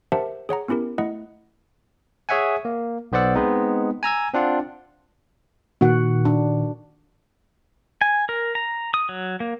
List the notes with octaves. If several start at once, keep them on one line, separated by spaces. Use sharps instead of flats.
G4 A#4 C5 E5 F#5 A5
G#4 C#5 F#5 A#5
B3 C#4 E4 G4 A#4
A3 E4 D#5 F#5
G#4 C#5 E5 F#5 G#5
A#3
B1 B3 C5 D5 F#5 E6
G#3 B3 C4 D#4
G#5 A#5 E6 G#6
C4 D4 F4 F#5
A#2 D#3 F#4 F#5
D4
G#5
A#4
A#5
D#6
F#3
A#3